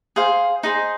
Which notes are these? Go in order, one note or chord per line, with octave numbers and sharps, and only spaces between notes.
G#4 C5 F5
D#4 G#4 C5